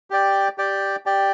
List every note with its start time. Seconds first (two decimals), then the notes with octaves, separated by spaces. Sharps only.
0.10 G4 D5 G5
0.58 G4 D5 G5
1.06 G4 D5 G5